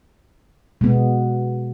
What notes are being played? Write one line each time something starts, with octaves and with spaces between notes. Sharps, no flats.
B2 G#3 B3